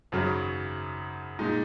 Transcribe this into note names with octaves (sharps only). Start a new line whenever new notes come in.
G#1 F#2 C#3 F#3
A#2 G#3 D#4